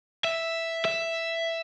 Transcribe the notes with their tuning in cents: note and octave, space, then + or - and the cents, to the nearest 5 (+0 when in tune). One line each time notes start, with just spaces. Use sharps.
E5 +0
E5 +5